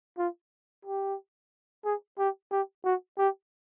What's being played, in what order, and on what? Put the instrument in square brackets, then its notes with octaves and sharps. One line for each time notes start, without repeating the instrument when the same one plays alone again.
[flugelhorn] F4
G4
G#4
G4
G4
F#4
G4